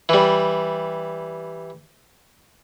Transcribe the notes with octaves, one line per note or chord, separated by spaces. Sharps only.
E3 G3